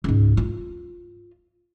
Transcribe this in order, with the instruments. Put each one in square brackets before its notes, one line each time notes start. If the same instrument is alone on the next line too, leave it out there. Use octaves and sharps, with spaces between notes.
[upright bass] C#2 G#2
F4